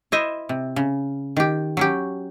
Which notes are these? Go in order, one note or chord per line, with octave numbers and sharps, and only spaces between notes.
E4 C5 D#5 E5
C3
C#3
D#3 G4
F#3 C#4 G4